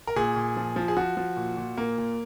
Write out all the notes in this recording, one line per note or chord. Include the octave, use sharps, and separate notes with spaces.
A#4
A#2 G#4
A#2
F3
F3
G#4
F3 F#4
F3
A#2
A#2
A#2 A#3
A#2